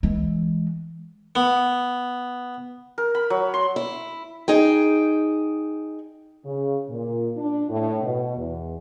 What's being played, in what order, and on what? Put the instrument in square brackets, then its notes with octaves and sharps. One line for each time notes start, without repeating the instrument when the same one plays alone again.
[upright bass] E3 G#3
[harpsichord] B3
[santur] A#4
B5
F#3
C6
[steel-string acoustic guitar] E4
D#4 G#4 G5
[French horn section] C#3
A#2
D4
A2
B2
E2